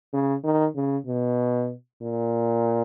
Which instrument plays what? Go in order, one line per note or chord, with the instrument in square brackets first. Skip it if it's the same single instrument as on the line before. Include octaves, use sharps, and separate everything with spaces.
[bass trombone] C#3
D#3
C#3
B2
A#2